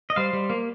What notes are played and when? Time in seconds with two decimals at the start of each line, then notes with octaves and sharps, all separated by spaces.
0.10 D#5
0.16 G3 C5 F5
0.33 G3
0.50 A#3